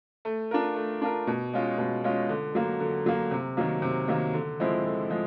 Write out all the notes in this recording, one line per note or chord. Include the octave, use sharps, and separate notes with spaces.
A3
D4 F4 A#4
A3
D4 F4 A#4
B2
G#3 C#4 F4
B2
G#3 C#4 F4
D3
F#3 A#3
D3
F#3 A#3
C3
D#3 F#3 A#3
C3
D#3 F#3 A#3
D3
F3 G#3 C4 E4
D3
F3 G#3